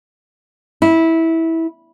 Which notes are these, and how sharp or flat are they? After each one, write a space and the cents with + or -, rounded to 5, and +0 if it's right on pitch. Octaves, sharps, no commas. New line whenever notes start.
E4 -15